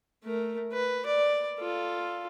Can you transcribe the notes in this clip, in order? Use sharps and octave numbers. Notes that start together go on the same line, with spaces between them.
A3 A#4
B4
D5
F4 A4